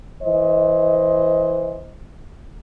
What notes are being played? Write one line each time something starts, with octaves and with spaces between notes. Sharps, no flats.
E3 C5 D#5